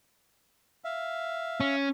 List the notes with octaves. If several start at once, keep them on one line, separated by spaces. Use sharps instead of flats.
E5 F5
C#4